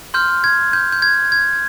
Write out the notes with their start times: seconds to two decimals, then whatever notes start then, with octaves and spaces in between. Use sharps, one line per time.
0.14 C6 F6 G6
0.44 G#6
0.73 G6
0.92 G6
1.02 G#6
1.32 G#6